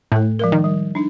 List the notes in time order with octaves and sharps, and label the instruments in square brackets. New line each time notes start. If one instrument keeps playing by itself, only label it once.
[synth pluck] A2 [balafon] A3 A4
[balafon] F3 G#3 A#4
[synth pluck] D#3
[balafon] G3
D4 D#4